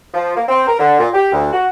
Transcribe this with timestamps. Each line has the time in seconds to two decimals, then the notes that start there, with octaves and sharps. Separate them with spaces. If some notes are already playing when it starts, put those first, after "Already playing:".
0.14 F3
0.36 A#3
0.48 C4
0.67 A#4
0.79 D3
0.99 A#2
1.14 G4
1.32 D2
1.53 F#4